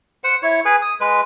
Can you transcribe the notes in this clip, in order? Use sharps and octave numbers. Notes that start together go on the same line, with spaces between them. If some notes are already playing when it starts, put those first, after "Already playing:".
C5 F#5
E4 C#5
G#4 B4
D#6
G#3 B4